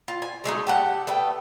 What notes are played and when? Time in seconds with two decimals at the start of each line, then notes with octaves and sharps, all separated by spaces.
0.08 F4
0.22 G#5
0.44 F#3 G#3 A3 D#4
0.67 G4 A4 F#5
1.07 A3 B3 G5